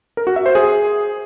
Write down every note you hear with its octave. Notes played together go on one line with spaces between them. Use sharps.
A#4
F#4
E5
C5
G#4